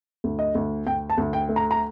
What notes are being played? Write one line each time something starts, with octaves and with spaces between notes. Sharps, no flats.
D2
D#5
D2
D2 G5
A5
D2
G5
A3
A#5
A#5